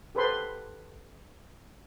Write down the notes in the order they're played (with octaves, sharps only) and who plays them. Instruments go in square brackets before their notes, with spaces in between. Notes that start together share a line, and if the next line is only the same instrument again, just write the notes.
[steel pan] G4 A4 B4 C5 B5 C6